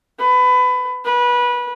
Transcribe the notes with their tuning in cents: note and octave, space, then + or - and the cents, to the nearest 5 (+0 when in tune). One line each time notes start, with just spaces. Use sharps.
B4 +25
B4 -20